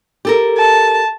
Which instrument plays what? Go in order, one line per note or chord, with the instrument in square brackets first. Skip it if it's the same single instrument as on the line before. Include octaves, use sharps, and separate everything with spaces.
[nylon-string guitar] G4 A4 A#4
[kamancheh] A5